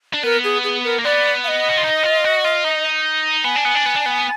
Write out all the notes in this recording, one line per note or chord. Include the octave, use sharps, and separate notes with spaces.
D4
B3 A#4
G#4
G#4
A#4
A#3
B3 D5
F5
D#5
F#4
F4
D#4
F4
F#4
F4
D#4
B3 G#5
D4
B3
D4
B3
D4
B3